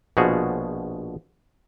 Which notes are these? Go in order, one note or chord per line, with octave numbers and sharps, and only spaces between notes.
A#1 B2 F3 F#4 G#4